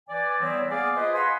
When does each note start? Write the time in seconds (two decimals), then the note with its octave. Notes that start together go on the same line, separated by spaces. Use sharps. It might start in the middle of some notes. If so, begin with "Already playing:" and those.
0.08 E3 D5 G#5
0.40 E3 G3 B3 C4 E4 C#5
0.71 A#3 B3 G#4 D5 F5 G#5
0.95 F4 G#4 B4 C5 D#5
1.14 D#5 F5 F#5 G#5 B5 C6